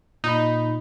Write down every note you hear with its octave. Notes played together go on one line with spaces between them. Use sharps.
A#2 D#4 B5